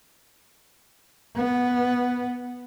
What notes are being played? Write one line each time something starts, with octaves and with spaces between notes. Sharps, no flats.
B3